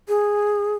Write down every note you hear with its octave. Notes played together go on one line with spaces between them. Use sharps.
G#4